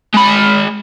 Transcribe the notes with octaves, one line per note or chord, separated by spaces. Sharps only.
G#3 B5